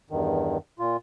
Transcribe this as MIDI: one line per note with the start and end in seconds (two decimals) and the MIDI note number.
0.10 0.57 40
0.10 0.57 43
0.10 0.57 51
0.79 0.97 46
0.79 0.97 65